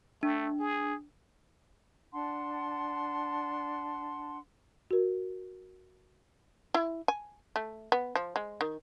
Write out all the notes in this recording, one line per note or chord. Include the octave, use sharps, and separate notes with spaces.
A3 D4
G#4
D4 F#5 A5 C6
F#4 A#4
E4
G#5
A3
B3
F3
G#3
D#3